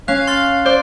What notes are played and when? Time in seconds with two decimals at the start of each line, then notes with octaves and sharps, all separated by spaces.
0.08 C#4 F5 F#6
0.27 C6 F6 A6
0.66 C5 D5